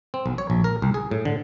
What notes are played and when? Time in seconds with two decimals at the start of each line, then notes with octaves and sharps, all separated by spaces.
0.14 C4
0.26 B1
0.38 C#5
0.50 A#1
0.64 A#4
0.82 C2
0.94 G#4
1.11 A2
1.25 D3